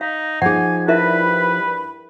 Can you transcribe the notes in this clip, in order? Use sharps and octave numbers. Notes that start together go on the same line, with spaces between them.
D#4 F5
F3 D#4 G#4 F#5 G#5
G2 E4 A#4 B4 E5 B5